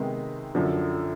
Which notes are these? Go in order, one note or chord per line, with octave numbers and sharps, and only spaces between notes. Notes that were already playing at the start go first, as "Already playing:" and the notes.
Already playing: C3 D#3 G#3 B3 D#4
F#2 D3 F3